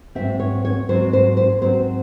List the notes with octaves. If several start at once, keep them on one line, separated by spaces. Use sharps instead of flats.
G#2 F#3 C4 E5
C#5
C#5
G#2 F#3 C4 C5
C5
C5
G#2 F#3 C4 C5